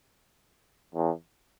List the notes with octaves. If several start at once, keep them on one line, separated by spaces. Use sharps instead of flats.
E2